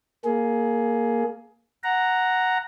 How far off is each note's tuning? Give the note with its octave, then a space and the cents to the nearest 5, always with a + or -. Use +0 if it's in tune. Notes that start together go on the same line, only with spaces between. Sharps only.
A#3 +0 G#4 +15
F#5 +0 A#5 +0